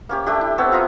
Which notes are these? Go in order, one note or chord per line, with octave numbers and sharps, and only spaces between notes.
A#3 C#4 G4
A3 D4 G4
E4
B3 C4 A4 C#5
F4 E5 A#5 D#6